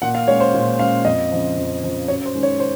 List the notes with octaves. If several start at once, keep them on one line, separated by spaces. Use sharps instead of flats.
A#2 F#5
F5
G#3 C#4 C#5
C5
A#2
G#3 C#4 F5
F2 D#5
C#3 F3
F2
C#3 F3
F#2 C#5
C5
D#3 G#3 C#4
C#5
C5